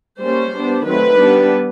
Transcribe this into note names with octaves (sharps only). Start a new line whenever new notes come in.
G3 A#3 C#4 C5
G3 B3 D4
D#3 F#3 A3 C4 B4
G3 B3 D4